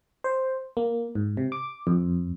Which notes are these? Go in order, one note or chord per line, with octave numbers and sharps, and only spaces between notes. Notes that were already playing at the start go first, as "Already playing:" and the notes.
C5
A#3
G#2
C3
D6
F2